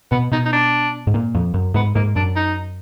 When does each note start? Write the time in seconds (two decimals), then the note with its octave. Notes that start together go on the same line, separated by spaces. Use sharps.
0.12 B2 B3
0.32 B2 D#4
0.45 D#4
0.53 D4
1.07 G#2
1.14 A#2
1.35 F2
1.54 F#2
1.74 G#2 B3
1.95 G#2 A#3
2.16 F#2 D4
2.36 D#4